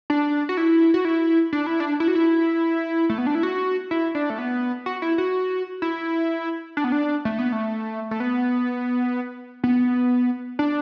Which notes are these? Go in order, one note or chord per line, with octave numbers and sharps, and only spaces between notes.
D4
F#4
E4
F#4
E4
D4
E4
D4
E4
F#4
E4
A3
B3
D4
E4
F#4
E4
D4
A3
B3
F#4
E4
F#4
E4
D4
B3
D4
A3
B3
A3
A3
B3
B3
D4